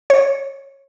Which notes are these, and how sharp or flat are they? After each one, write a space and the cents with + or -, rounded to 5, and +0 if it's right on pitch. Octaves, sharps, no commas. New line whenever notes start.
C#5 -20